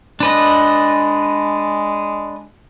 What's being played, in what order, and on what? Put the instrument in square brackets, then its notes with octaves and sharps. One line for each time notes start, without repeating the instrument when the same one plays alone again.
[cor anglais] G#3 [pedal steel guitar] D4 B4 D#5